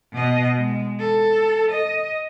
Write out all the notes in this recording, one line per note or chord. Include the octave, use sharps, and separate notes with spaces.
B2 D#5
G#3
A4
D#5